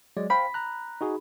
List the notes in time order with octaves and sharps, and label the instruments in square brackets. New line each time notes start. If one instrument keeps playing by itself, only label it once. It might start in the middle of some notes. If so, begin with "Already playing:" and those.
[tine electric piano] F#3 G#3 D5
[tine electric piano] C5 F5 G5 [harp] B5
[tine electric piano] A#5 F#6
D#4 F#4 G#4